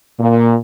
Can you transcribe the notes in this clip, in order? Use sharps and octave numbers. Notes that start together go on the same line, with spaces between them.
A#2